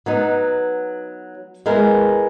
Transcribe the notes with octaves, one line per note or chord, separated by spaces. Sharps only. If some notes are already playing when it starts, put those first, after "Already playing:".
F#3 B3 D#4
G#3 B3 E4 A#4